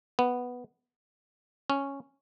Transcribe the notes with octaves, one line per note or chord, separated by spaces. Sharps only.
B3
C#4